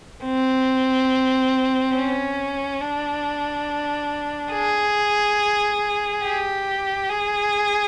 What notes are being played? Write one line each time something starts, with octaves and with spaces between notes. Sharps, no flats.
C4
C#4
D4
G#4
G4
G#4